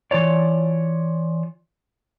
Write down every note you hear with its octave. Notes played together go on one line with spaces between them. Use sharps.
E3 F4 C#5 D5